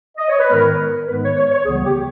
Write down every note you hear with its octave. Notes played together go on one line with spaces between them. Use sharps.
D#5
C#5
B4
G#2 D#3 G#3 B3 A#4
G#2 D#3 G#3 B3 B4
C#5
C#5
C#5
C#2 C#3 E3 G3 B3 G#4
G4